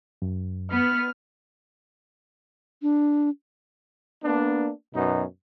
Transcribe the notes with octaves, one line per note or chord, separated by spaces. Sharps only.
F#2
B3 F6
D4
A#3 B3 D4
F#2 B2 B3 D#4